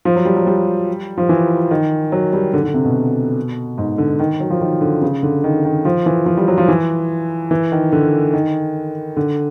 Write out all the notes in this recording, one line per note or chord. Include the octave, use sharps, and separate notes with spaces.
F3
F#3
G3
F#3
G3
F3
E3
D#3
F#3
G3
D3
D3
C3
B2
G#2
D3
D#3
F#3
F3
D#3
D3
C#3
D3
D#3
D#3
F3
E3
F3
G3
F#3
F3
E3
E3
D#3
D3
D#3
D3